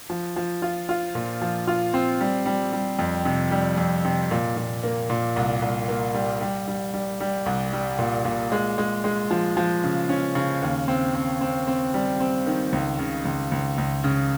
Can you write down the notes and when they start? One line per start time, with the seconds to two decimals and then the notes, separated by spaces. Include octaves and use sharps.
0.10 F3
0.36 F3
0.62 F4
0.89 F4
1.15 A#2
1.42 F3
1.67 F4
1.94 C4
2.21 G3
2.46 G3
2.73 G3
2.99 F2
3.25 C3
3.51 G3
3.77 F2
4.05 C3
4.31 A#2
4.57 A#2
4.83 A#3
5.10 A#2
5.36 C2
5.62 C2
5.88 A#3
6.14 G3
6.41 G3
6.68 G3
6.94 G3
7.20 G3
7.46 C2
7.73 G3
7.99 A#2
8.25 A#2
8.52 G#3
8.78 G#3
9.04 G#3
9.31 F3
9.57 F3
9.84 C#3
10.09 C#4
10.35 C#3
10.62 D#2
10.88 C4
11.15 C4
11.41 C4
11.67 C4
11.94 G3
12.20 C4
12.46 D#3
12.72 C#2
12.99 C#3
13.25 C#2
13.52 C#2
13.78 C#2
14.04 C#3